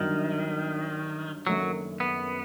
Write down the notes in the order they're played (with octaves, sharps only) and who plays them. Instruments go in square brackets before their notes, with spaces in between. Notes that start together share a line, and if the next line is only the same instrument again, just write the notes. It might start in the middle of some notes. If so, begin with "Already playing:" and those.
Already playing: [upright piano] G1 G2 F#3 [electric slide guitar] D#3
[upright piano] F#1 F#2 D#3 A3 [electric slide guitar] F#3
[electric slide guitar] B3